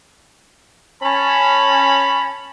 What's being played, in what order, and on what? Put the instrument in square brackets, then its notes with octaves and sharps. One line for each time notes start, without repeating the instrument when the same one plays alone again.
[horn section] C#4 A5 B5